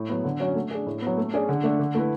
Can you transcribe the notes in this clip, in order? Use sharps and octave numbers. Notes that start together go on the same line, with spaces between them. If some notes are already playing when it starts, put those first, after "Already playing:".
Already playing: A2
F#3 B3
D3
F#3 C#4 F#4 C#5
A3
D4 G#4
A2
F#3 B3
A3
C#4 G#4 D5
D3
A3 D4
D3
A3 E4 B4